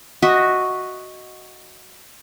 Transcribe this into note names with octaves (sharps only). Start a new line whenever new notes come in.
F#4 D#5 E5